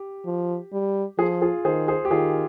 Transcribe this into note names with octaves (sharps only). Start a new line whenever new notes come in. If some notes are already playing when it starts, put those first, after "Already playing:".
Already playing: G4
F3
G3
F3 F4 G#4
F4 G#4
D#3 G#4 C5
G#4 C5
G4
D#3 F4 G#4